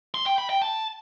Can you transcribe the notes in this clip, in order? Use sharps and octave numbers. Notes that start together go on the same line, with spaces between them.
C6
G5
B5
G5
A5